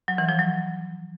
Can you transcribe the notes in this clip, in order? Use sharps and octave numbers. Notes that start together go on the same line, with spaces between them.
F#3
E3
F3
F#3